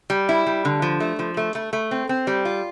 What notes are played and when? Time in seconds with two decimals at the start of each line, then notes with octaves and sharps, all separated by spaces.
0.10 G3
0.29 E4
0.47 G3
0.65 D3
0.82 F3
1.00 A3
1.19 F3
1.37 A3
1.55 A3
1.73 A3
1.91 C4
2.09 C4
2.27 G3
2.45 F4